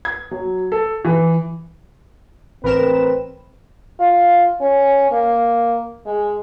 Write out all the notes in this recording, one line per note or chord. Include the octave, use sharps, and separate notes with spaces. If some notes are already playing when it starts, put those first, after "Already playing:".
G#6
F#3
A4
E3
A1 C4 A#4 B4 E7
F4
C#4
A#3
G#3